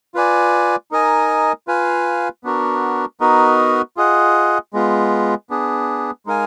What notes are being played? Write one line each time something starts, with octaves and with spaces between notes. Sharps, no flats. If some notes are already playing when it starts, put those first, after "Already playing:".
F4 B4 D5 G#5
D#4 A#4 D#5 G#5
F4 B4 F5 G#5
B3 D4 F#4 A#4
B3 D#4 F#4 A#4 D#5
F4 G#4 D#5 F#5
G#3 B3 F4
B3 D4 G#4
G#3 D#4 A#4 F5 G#5